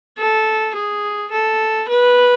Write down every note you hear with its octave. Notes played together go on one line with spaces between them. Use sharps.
A4
G#4
A4
B4